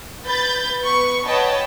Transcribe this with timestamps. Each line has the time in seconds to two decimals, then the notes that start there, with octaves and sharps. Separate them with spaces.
0.24 B4 B5 G6 A6
0.81 B3 B4 C#6
1.25 B4 C#5 D#5 F#5 G5 A5